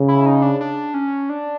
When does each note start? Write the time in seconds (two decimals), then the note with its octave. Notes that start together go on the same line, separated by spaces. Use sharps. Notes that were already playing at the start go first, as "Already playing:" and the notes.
Already playing: C#3
0.08 E4
0.26 D#4
0.42 D4
0.61 D4
0.94 C#4
1.29 D4